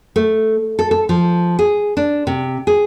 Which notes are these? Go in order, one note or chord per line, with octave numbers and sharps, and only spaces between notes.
A3
A4
A4
F3
G#4
D4
C3
G#4